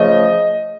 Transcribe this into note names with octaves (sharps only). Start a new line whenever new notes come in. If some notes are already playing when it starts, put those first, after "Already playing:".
Already playing: C#3 F3 A3 D#5